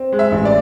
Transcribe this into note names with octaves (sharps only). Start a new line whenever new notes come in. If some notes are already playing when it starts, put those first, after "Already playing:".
Already playing: C4
G#3
E5
A1
D5